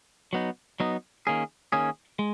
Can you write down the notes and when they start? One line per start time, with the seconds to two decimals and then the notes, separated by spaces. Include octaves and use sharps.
0.33 F#3 B3 D#4
0.80 F#3 B3 D#4
1.27 D#3 A#3 C#4 G#4
1.72 D#3 A#3 C#4 G#4
2.19 G#3